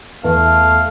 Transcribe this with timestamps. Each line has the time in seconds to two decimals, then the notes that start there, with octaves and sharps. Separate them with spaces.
0.24 E2 A3 F5